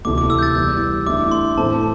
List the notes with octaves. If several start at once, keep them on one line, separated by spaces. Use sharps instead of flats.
D2 C3 E3 A3 D6
D6
E6
G6
A6
E2 E3 G3 G6
D3 A3 E4 D6
C6
A2 E3 C4 A4 A5